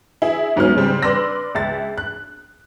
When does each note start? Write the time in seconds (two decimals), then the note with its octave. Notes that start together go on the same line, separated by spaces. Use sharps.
0.22 E4 G#4 E5
0.56 D2 G#2 F#3 B3 C#4 F6
0.76 C#3 G3 C4
1.03 B4 D5 C6 E6 A#6
1.55 C#2 E5 A6
1.98 F#6